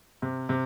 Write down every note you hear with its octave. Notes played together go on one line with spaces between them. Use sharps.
C3
C3